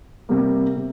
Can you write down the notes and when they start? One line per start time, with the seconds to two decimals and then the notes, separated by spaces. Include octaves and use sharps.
0.29 C3 G3 A#3
0.76 C3